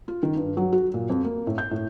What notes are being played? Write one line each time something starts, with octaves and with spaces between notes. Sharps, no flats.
F4
D#3
G2
F#3
F#4
A#2
F2
A#3
A2
G6
A2